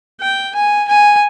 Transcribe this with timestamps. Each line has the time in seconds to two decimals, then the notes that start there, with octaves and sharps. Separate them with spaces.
0.21 G5
0.55 G#5
0.88 G#5